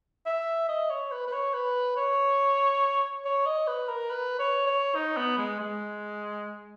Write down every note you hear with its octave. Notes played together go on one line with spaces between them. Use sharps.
E5
D#5
C#5
B4
B4
C#5
B4
C#5
C#5
D#5
B4
A#4
B4
C#5
C#5
D#4
B3
G#3
G#3